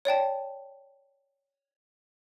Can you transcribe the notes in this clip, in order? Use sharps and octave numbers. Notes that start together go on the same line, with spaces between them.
C#5 D5 G5 A5